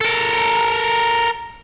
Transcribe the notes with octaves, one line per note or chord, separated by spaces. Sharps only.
A4 A#4